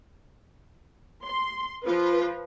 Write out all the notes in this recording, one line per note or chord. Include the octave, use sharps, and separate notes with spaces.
C6
F3 F4 B4